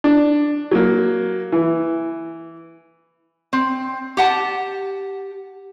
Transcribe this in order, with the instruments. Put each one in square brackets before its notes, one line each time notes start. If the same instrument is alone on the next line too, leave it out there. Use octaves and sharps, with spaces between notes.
[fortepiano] D4
F#3 A#3
E3
[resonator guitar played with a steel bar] C4
G4 F#5 A5